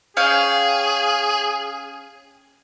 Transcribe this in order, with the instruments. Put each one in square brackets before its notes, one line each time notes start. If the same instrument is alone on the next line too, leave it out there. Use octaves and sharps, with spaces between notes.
[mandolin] C#4 F5 G5 [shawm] G#4